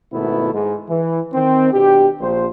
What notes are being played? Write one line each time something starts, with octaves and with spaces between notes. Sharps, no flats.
G#1 B2 A3 B3 E4
G#2
E3
D#3 C4
B2 D4 G4
A#1 C5